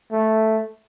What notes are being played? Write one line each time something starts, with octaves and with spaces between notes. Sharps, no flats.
A3